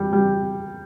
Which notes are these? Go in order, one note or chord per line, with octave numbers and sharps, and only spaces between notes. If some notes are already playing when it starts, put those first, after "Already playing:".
Already playing: G3
G3